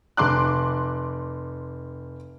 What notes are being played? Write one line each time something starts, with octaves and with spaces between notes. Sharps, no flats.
F1 C6 D6 F#6